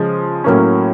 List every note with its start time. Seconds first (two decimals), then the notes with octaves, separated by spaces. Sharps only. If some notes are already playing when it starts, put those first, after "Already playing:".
Already playing: C#3 F3 G#3
0.44 A2 F#3 A#3 C#4